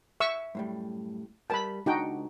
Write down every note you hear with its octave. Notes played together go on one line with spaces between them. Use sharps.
E5 C#6 E6
F#2 A2 G3
G3 A#4 G5 A5 B5
C#2 D4 D#4 F#4 G5 A5